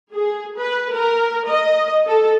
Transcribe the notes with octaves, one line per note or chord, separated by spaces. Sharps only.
G#4
B4
A#4
D#5
A4